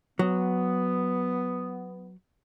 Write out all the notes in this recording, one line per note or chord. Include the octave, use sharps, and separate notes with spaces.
F#3 B3